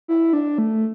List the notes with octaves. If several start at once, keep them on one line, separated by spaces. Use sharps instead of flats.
E4
D4
A3